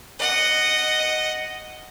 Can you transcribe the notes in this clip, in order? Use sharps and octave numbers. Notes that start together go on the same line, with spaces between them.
D#5 F#5